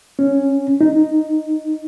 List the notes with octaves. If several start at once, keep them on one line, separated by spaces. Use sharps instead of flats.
C#4
D#4